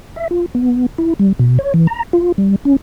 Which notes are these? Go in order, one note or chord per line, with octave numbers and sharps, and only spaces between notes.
E5
F4
B3
E4
G3
B2
C#5
E3
A#5
F4
G3
C#4